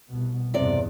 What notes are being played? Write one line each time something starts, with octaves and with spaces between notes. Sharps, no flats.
C2 B2
E2 G2 C3 D5